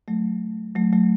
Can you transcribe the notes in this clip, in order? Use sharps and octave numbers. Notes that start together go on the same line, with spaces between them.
F#3 A3
F#3 A3
F#3 A3